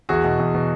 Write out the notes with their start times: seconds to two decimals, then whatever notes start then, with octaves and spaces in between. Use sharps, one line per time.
0.09 E2 F#4 G#4
0.24 B2
0.39 E2
0.55 B2